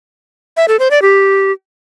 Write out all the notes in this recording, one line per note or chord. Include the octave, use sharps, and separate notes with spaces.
E5
A4
C5
D5
G4